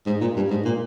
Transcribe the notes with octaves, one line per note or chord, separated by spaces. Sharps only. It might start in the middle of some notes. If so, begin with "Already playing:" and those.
G#2
A#2
G2
G#2
A#2